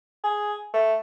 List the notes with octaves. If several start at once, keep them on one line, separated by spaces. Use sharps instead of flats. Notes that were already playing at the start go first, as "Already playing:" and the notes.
G#4
A3